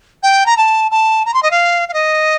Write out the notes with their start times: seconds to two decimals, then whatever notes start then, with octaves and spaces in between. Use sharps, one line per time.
0.23 G5
0.46 A#5
0.57 A5
0.91 A5
1.26 A#5
1.34 C6
1.43 D#5
1.51 F5
1.89 F5
1.94 D#5